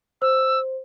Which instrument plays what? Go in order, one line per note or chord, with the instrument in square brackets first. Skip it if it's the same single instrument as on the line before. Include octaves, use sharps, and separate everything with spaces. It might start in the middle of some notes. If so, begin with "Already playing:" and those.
[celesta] C5 [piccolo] E6